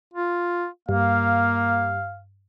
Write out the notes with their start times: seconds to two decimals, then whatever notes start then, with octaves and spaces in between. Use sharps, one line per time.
0.14 F4
0.89 G2 A#3 F5